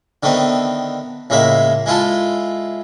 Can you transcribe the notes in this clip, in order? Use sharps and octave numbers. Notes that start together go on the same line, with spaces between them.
D3 D#3 A3 B3 C4
C#2 A2 G#3 A#3 E5
G#3 E4 F4 A4